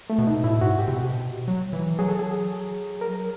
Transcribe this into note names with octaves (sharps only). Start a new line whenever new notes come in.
A3
B2
D#4
A2 E4
G#2 F#4
G4
C3
B2
F#3
E3
F#3 G#4
A4
G#4
A#4